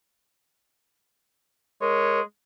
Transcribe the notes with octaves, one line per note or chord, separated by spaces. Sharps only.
G#3 A#4 C#5